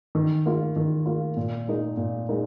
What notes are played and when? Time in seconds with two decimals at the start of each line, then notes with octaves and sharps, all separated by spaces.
0.15 D#3
0.46 A#3 F4
0.76 D#3
1.06 A#3 F4
1.37 A#2
1.68 G#3 D#4 A#4
1.97 A#2
2.29 G#3 D#4 A#4